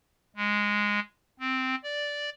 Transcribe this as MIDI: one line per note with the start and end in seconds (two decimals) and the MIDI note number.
0.36 0.99 56
1.40 1.75 60
1.83 2.30 74